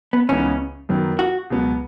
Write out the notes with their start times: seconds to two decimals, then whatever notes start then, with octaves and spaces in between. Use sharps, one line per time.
0.13 B3
0.28 C#2 C#3 E3 B3 C#4 D#4
0.89 F#2 D#3 F#3 B3
1.19 F#4
1.50 C#2 B2 F#3 B3